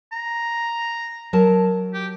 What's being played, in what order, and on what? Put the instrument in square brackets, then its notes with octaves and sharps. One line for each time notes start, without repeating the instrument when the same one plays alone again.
[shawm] A#5
[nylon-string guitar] F#3 A#4 A5
[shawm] G4